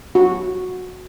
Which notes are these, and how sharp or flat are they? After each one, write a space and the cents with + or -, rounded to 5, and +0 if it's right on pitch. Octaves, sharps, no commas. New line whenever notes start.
F#4 -15